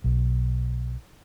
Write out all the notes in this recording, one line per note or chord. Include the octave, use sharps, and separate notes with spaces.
B1